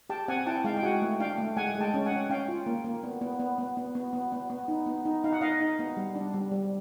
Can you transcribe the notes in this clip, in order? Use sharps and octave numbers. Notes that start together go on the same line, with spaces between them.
G4 G5 A5
C4 F#5 G#5
E4 G5 A5
G#3 F5 G5
G5
F#4 F#5 G#5
A3
D4 F5 G5
A3
G#3 F#5 G#5
G#3
G5 A5
C#4
F#5 G#5
C#4
C#4 F5 G5
F4
A#3
A#3
B3
B3
B3
B3
B3
B3
B3
B3
B3
D#4
B3
D#4
D#4 F5
F#5
D#4 D#5 F5
D#4
B3
G3
D4
G3
G3